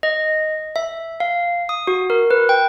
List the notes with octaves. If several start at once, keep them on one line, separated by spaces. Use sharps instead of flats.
D#5
E5
F5
D#6
F#4
A#4
B4
G5